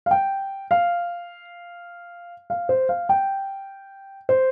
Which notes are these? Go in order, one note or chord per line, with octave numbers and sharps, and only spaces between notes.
F5
G5
F5
F5
C5
F5
G5
C5